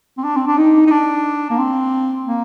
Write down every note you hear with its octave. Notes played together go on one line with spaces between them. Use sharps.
C4
D4
C4
D4
D#4
D#4
D4
A#3
C4
A#3